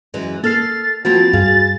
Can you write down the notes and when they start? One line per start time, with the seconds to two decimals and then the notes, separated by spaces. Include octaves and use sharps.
0.14 F#2 E3 G#3
0.44 A#3 A4 F6 A6 C7
1.05 F3 A#3 C4 F#4 B5 A6
1.33 G2 G#4 F5